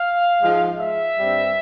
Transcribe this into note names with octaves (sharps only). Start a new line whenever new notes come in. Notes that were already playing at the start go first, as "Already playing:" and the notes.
Already playing: F5
G#2 F3 G#3
E5
G2 G3 C4